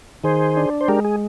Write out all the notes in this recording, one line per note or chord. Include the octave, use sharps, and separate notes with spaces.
D#3 G#4 C5
D4
C5
G#3 G4 A#4
G#4